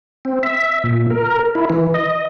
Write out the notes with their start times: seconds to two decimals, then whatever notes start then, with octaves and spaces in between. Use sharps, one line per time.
0.25 C4
0.43 E5
0.84 A#2
1.10 A#4
1.55 E4
1.70 E3
1.94 D#5